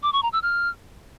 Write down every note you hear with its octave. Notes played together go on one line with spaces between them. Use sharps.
D6
C#6
A#5
E6
F6